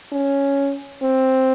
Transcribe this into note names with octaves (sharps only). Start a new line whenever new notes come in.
C#4
C4